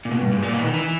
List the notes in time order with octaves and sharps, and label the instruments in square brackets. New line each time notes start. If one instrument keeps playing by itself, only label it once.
[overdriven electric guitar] A#2
B2
G2
G#2
A#2
B2
E3
D#3
E3